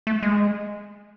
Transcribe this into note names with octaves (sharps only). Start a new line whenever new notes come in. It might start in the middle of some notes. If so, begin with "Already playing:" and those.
A3
G#3